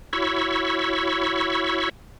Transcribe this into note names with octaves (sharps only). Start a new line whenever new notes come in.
E4 F#4 C#5 B5 C#6 E6